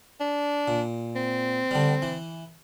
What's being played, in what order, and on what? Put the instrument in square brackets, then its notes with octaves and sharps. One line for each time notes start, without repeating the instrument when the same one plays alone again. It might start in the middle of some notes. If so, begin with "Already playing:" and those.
[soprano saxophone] D4
[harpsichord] A#2
[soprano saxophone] C4
[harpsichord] D3 G3
E3